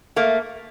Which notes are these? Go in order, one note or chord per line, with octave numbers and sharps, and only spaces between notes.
A3 A#3